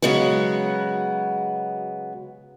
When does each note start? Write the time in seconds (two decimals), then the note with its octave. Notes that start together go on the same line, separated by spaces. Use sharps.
0.02 C#3 F#3 G#3 B3 F#4